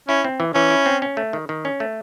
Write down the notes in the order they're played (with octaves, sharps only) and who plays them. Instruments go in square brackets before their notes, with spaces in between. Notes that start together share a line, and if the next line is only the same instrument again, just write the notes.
[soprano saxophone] C#4 [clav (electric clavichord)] E4
[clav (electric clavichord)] C4
E3
[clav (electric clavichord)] E3 [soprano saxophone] C#4
[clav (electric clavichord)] E4
C4
C#4
A3
D#3
D#3
C#4
A3